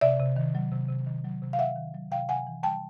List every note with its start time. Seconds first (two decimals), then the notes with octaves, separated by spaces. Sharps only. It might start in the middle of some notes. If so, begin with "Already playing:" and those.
0.01 C3 D5 E5
0.20 C3
0.36 D#3
0.55 F#3
0.72 C3
0.89 C3
1.06 D#3
1.25 F#3
1.42 C3
1.53 F5
1.59 C3 E5 F#5
1.76 D#3
1.94 F#3
2.11 C3 F5 G5
2.29 C3 F#5 G#5
2.47 E3
2.63 G3 G5 A5